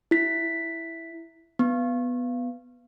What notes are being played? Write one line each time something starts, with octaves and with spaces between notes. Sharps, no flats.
E4 B6
B3